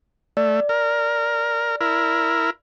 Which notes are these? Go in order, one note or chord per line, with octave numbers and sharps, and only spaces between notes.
A3 D5
A#4
E4 A#4